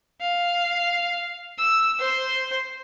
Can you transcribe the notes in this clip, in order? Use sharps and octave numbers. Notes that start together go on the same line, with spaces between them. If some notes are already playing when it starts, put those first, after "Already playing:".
F5
E6
C5